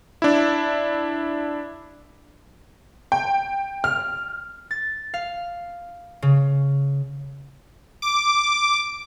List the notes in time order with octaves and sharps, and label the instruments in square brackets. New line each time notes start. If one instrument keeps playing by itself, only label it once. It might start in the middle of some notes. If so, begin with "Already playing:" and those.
[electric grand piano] D4 E4
[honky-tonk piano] G5
F6
[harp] A6
F5
C#3
[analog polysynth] D6